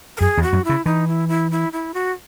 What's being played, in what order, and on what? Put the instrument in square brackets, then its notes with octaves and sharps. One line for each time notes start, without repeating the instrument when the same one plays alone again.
[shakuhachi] A#4
[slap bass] F#2 [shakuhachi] G#4
[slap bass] E2
[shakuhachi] F#4
[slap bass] F#2
[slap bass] C#3 [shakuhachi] E4
[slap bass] E3 [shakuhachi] D#4
[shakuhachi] E4
E4
E4
E4
F#4